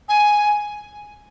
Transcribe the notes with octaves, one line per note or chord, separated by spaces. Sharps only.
G#5